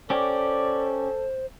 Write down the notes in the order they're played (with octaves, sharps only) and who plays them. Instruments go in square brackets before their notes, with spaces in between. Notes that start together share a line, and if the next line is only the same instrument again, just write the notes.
[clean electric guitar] C#4 G4 [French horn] A4 [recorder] C5 [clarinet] D5